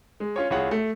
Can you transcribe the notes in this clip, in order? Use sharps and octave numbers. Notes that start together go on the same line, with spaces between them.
G#3
C#4 F4 C#5
C2 F4 G#4 C#5 F#5
A3